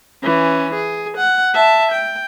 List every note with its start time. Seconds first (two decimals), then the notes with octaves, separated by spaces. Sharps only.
0.23 E3 C#4
0.74 G#4
1.17 F#5
1.54 E5 A5
1.91 G5